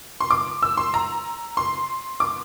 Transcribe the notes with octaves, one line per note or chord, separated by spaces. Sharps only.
C6
D6
E6
C6
A#5
C6
D6